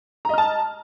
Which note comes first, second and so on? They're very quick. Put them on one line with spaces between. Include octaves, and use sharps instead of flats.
A#5 D#5 F6 A5